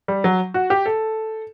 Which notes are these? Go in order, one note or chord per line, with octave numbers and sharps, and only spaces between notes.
G3
F#3
F#4
G4
A4